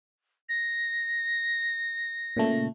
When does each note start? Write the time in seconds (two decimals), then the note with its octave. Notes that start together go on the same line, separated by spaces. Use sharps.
0.49 A#6
2.37 A#2 C#3 A3